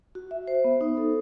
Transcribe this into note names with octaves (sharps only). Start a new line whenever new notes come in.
F#4
E5
C5
B3
D#4
A4